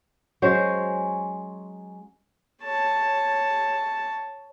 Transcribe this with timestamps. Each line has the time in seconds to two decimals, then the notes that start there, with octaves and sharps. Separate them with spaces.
0.42 F#3 G#3 C#4 C5
2.64 C#5 A5